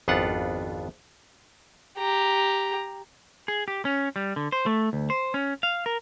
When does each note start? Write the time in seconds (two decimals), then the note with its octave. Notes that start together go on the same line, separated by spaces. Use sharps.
0.08 G#1 F2 B3 D4 F4 F#5
1.98 G4 A#5
3.48 G#4
3.68 G4
3.85 C#4
4.16 G3
4.36 D3
4.52 C5
4.66 A3
4.93 D2
5.10 C5
5.34 C#4
5.63 F5
5.86 A#4